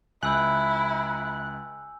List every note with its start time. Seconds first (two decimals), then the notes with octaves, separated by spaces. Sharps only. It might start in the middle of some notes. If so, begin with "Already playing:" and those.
0.23 C#2 E4 G#5 E6 F#6 G6